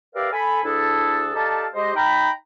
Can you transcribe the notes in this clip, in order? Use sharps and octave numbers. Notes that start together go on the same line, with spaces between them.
G4 A#4 B4 D5 E5 F5
A4 G#5 B5
D2 D4 E4 G#4 A4
D#4 G4 A4 D5 F5 A5
G#3 G4 C5 D#5
D#4 G5 A#5 B5